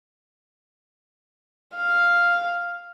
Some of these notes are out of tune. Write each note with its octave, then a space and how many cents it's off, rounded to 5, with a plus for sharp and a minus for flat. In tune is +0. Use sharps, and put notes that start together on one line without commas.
F5 +0